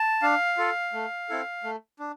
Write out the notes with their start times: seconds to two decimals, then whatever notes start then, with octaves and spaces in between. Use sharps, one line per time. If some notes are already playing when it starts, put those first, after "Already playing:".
Already playing: A5
0.22 D4 F5
0.57 F4 A4
0.93 A3
1.29 C4 E4 A4
1.64 A3
1.99 D4